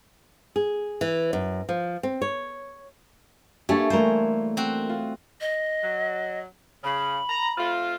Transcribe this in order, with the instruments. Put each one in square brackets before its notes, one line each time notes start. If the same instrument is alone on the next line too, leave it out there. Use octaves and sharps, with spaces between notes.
[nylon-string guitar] G#4
E3
F#2
F3
C4
C#5
[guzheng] A3 [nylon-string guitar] A#3 D4 G4 [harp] C#5 G#5 A5
[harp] E3 G3 A3 [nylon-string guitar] A#3 A#4 [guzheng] C5
[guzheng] C4 F#4
[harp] F4
[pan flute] D#5
[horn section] F#3
[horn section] C#3 [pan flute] B5
[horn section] A#5
A3 C4 F4